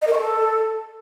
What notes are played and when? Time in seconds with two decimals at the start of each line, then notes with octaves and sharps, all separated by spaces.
0.02 D#5
0.07 A#4
0.13 C#6
0.19 A4